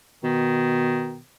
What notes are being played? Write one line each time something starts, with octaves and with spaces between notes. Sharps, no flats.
B2 D#3